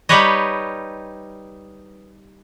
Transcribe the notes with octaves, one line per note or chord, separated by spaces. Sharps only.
G3 D#4 G4 B4 C#5 D#5